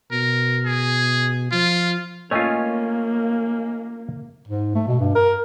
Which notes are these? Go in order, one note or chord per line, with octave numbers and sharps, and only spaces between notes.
B2 A#4
G#4
F3 F4
A3 A#3 C#4 F4 C#5 D#5 G#5
G#2
A3
B2
G2
A#4